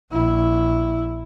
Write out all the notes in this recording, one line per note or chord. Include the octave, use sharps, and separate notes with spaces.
A#1 E4